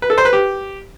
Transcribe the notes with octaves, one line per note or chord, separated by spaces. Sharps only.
B4
A4
C5
B4
G4